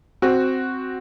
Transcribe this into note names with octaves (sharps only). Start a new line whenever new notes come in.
C4 F#4